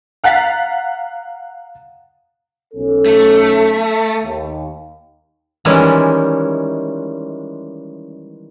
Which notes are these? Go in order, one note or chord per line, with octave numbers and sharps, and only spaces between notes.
F5 F#5 A#5 A6 B6
B1 C#4 A4
A3
D#2
D#3 E3 G3 G#3 C#4 E4